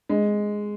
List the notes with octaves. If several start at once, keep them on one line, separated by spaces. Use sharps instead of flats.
G#3